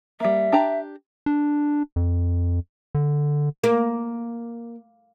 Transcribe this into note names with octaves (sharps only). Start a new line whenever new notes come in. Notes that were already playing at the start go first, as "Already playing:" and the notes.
G3 A#3 E5
D4 G4 A#5
D4
F2
D3
A#3